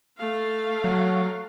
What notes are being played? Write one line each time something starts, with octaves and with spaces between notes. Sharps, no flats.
A3 F5
F#3